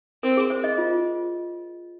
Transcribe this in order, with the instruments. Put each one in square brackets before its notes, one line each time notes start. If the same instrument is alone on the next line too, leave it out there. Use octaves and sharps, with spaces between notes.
[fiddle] C4 [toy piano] A#4
[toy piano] G#4
C5
D#5
F4